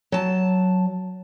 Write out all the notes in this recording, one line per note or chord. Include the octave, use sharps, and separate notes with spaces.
F#3 A5